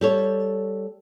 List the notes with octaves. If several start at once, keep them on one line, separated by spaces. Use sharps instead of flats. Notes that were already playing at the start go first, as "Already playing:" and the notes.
G3 A4 C#5